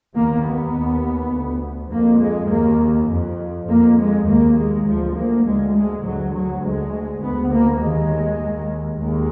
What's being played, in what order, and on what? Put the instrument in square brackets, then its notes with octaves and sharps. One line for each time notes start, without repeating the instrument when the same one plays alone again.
[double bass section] D#2 A#3
B3
D#2
D2
F2 A#3
G#3
D#2 A#3
F2
F2 A#3
G#3
D#2 A#3
G#3
D2 F3
A#3
D2 G#3
G#3
D2 F#3
F#3
D2 G#3
D2 B3
A#3
D#2 G#3
D#2
D#2 G#3